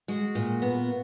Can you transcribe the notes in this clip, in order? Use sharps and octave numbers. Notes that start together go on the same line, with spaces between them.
G#3 F#4
A#2
B3